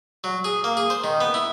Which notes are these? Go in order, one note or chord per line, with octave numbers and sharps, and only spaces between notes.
F#3
G#4
A#3
G#4
C5
D#3
B3
E4